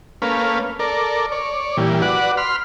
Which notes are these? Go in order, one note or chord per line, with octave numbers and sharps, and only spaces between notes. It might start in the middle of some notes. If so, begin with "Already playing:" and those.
A3 A#3 C#4 B4 F5
A4 A#4 D5
C#5 D5
A#2 E3 G3
F#4 B4 D5 F#5
B5 C6 F6